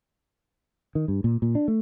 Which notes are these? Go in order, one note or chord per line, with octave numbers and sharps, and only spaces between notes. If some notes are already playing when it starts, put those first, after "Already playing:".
D#3
G2
A#2
A#2
D4
A3